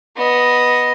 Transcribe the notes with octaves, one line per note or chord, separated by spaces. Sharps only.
B3 D#5